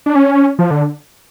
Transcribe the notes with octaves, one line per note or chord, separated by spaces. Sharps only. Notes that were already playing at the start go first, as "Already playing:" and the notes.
D4
C#4
F3
D3